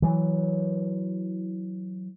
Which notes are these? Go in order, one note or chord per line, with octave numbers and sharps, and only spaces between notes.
E3 F#3